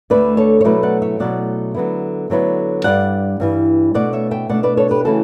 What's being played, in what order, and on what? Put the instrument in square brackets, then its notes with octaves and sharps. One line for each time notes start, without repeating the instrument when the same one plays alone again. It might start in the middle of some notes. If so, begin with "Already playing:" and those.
[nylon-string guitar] D2 D3 A3 B4 D5
A4 C#5
C#5
B2 F#3 A3 E4 B4 D5
D5 F#5
C#5 E5
B2 F#3 A3 E4 D5 F#5
D3 F#3 B3 E4
D3 F#3 B3 E4
G2 E3 G3 D5 F#5
G2 E3 G3
B2 A3 D4 D5 F#5
C#5 E5
E5 G5
B2 A3 D4 D5 F#5
B4 D5
A4 C#5
G4 B4
C#3 E3 A3 E4 F#4 A4